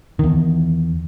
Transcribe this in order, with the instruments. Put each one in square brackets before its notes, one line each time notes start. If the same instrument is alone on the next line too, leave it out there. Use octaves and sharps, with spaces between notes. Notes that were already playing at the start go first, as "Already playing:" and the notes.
[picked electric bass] E2 D#3